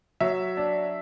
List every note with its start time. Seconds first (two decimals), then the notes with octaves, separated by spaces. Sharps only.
0.20 F#3 E5
0.57 D4